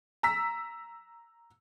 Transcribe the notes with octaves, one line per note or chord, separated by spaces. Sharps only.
A#5 E6 B6